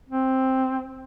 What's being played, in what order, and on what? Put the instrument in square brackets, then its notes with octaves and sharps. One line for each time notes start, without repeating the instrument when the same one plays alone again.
[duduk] C4